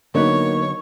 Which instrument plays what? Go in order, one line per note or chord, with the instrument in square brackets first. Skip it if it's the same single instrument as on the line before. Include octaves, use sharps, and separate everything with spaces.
[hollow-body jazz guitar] D3 F#3 B3 [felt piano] A#3 D#4 [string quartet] C#5